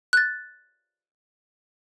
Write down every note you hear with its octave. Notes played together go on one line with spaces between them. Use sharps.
F#6 A6